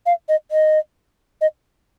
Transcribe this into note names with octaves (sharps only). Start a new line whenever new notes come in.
F5
D#5
D#5
D#5